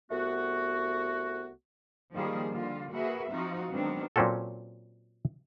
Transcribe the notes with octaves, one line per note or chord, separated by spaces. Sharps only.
C2 A3 B3 F#4
D#3 F3 G3 A#3 G#4
D3 G3 A#3 F4
A#3 F#4 G#4 A#4 B4 E5
F3 C4 D#4 F4 F#4
D#3 F#3 G#3 B3 C4 D4
A#2 F#3 C4 C#4 F#4 A4